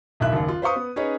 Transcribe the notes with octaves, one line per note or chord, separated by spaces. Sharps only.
E1 B1 E4 E5 F#6
F#1 D#2
F4
B4 C5 F5 C#6 D#6
B3
C#4 D#4 G#4 B4 C#5